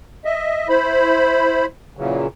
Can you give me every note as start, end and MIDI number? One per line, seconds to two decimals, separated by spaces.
0.25 0.68 75
0.25 0.68 76
0.69 1.66 64
0.69 1.66 72
0.69 1.66 83
1.97 2.27 46
1.97 2.27 49
1.97 2.27 52
1.97 2.27 54